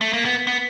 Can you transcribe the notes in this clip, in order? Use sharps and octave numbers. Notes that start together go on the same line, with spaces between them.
A3
A#3
B3
B3